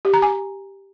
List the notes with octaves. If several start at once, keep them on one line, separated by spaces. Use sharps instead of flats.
G4
A#5
G#5